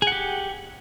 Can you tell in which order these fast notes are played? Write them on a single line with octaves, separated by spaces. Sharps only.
G#4 F#5 G4